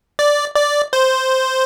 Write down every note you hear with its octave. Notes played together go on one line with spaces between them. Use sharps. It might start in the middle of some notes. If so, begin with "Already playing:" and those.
D5
D5
C5